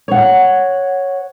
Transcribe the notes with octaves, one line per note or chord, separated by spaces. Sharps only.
C#5 F#5